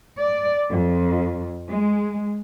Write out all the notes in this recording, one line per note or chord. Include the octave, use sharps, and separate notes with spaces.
D5
F2
G#3